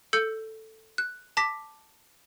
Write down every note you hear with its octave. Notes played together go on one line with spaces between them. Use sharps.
A4 E6 G6 C#7
F#6
A5 D6 A#6 B6